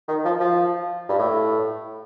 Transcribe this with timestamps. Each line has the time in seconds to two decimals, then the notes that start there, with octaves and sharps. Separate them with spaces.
0.08 D#3
0.25 F3
0.40 F3
1.09 G2
1.19 A2